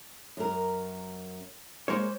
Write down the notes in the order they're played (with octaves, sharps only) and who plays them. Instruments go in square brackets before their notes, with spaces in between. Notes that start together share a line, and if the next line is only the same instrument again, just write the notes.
[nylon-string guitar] F#2 A#4
[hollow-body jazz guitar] G#3 A#3 C#5 [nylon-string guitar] C5